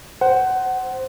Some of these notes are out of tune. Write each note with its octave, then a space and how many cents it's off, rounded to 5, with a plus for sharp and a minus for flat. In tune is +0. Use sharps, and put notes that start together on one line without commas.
C5 +0 F#5 +20